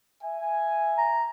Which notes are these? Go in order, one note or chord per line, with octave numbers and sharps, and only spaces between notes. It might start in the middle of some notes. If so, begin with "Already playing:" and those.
E5 G#5
A#5